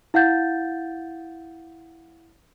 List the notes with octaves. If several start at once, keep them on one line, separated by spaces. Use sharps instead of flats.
E4 F5 F#5 G6 A6